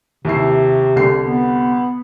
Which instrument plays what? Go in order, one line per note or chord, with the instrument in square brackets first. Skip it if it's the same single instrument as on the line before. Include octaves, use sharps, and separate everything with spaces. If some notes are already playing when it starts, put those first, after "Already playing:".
[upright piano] D#2 E4 C7 [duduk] C3
[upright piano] C2 D3 C7
[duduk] B3